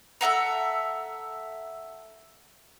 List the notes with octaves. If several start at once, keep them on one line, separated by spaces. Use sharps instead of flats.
A4 E5 F#5 A#5